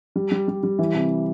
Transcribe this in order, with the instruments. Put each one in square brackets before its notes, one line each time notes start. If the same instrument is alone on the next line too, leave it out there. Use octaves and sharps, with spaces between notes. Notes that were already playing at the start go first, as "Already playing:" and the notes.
[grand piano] G3
G3
G3
G3
E3
C3